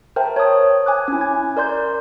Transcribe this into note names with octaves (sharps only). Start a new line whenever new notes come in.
A#4 C5 E5 G5 A5
C#5 A5 D#6
G#5 D6 F#6
C#4 E4
G#6
A#4 D5 C6 G6